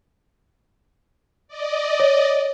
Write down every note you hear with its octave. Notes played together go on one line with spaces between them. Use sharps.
D5 D#5
C#5